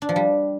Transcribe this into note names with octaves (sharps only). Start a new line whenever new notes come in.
D4
F3
G3